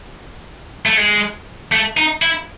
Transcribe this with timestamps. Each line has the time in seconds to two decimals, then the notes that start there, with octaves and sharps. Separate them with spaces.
0.86 A3
0.97 G#3
1.72 A3
1.97 D#4
2.22 E4